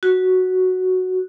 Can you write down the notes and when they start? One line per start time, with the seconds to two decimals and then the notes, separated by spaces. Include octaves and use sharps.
0.03 F#4